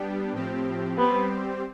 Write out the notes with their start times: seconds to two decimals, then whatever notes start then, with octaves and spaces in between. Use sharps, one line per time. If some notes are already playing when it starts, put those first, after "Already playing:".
Already playing: G3 B3 D4 G4
0.32 A2 F3 C4 G4
0.97 G3 B3 C4 G4 C5